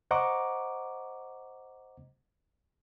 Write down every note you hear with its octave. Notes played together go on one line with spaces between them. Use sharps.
C5 D#5 F#5 A#5 C#6 D6